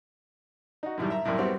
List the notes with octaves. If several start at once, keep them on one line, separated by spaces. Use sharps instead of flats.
D#4 F#4
F#2 A2 D#3 G3
E5 A#5
C2 F#2 A2
G3 B3 C4 F#4